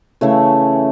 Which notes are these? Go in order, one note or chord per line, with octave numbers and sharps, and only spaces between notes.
C#3 E3 A3 C#5 E5